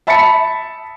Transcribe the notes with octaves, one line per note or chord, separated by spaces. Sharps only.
E5 A5 B5 A6 B6 C#7